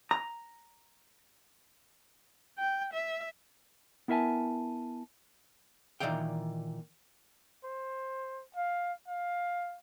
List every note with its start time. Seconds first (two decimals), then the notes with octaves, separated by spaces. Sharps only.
0.11 A#5
2.58 G5
2.93 E5
4.08 B3 E4 A#4 E5 G#5 A5
6.00 A#2 D#3 E3 D5 F5 G5
7.64 C5
8.56 F5
9.08 F5